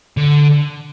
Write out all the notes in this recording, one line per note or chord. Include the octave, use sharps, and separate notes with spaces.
D3